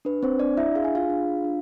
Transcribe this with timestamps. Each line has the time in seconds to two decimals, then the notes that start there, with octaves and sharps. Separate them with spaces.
0.05 D4 B4
0.23 C4 C5
0.40 D4 D5
0.57 E4 E5
0.75 G#4 F5
0.84 G#5
0.95 F4 F5
1.10 D4
1.44 D4